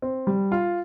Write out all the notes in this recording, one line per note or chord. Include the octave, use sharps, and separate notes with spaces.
C4
G3
F4